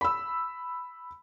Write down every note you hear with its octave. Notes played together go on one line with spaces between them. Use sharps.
B5 E6